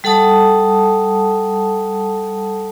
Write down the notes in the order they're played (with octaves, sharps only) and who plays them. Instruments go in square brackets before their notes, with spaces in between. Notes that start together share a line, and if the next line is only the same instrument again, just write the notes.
[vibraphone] G3 A4 F#5 A5 D#6